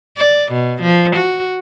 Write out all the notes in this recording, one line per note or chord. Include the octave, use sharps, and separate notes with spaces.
D5
B2
F3
F#4